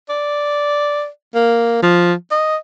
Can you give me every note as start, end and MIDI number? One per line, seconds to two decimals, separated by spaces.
0.09 1.08 74
1.35 1.79 58
1.82 2.13 53
2.32 2.56 75